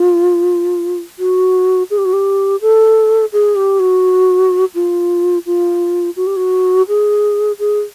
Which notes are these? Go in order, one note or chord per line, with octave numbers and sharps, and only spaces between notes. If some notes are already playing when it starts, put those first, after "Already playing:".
Already playing: F4
F#4
G#4
G4
F#4
G4
A4
G#4
G4
F#4
F4
F4
F#4
G4
F#4
G#4
G#4